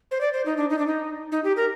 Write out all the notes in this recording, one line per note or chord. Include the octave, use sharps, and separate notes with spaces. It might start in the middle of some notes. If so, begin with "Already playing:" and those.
C5
D5
C5
D#4
D4
D#4
D4
D#4
D#4
G4
A#4